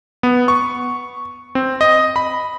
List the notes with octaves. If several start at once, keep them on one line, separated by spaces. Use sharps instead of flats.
B3
C#6
C4
D#5
B5